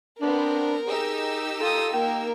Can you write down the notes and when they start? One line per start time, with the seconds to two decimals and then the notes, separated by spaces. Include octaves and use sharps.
0.22 B3 C4 D4 A#4
0.87 D#4 G4 G#4 E6
1.61 F4 A4 D#6
1.93 A#3 A#4 G5